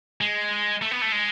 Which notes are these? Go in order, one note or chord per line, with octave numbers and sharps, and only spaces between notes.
G#3
A3
B3
A3
G#3